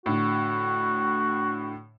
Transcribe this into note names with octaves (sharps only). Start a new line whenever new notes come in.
A2 D3 F#4